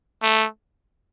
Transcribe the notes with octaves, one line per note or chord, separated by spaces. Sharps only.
A3